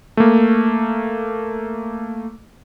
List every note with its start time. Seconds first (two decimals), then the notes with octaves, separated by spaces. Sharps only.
0.17 A3 A#3